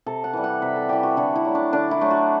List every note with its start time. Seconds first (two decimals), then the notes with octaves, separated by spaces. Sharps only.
0.06 C3 A4
0.24 F#5
0.33 E3 G3
0.44 F#5
0.62 C3 E5
0.76 A4
0.89 E3 G3 G4
1.03 F#4
1.17 D3 E4
1.35 E4
1.45 F#3 A3
1.55 D4
1.73 D3 D4
1.91 E4
2.01 F#3 A3
2.10 F#4